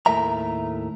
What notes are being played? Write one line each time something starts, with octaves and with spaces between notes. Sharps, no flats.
D#2 A2 A3 A#4 E5 A#5